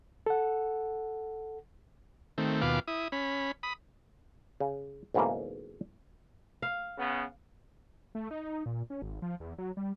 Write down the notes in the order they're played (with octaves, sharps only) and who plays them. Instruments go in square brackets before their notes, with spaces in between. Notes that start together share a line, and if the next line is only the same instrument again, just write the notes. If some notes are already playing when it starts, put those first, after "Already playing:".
[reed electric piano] A4 F#5
[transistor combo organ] D#3 A3 C4
D#2 B2 F4 B4 F5 D6
E4 D#6
C#4 B5
B5 D#6
[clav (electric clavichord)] C#3
B1 G#2 C#3 E3 A3 A#3
[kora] F5
[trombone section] C#3 B3
[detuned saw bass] A3
D#4
A#2
C#4
G#1
F3
E2
F#3
G3